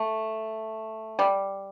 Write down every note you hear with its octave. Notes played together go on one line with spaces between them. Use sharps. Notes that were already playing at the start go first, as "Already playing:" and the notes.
Already playing: A3
G3